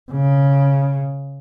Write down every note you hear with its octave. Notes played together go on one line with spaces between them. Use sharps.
C#3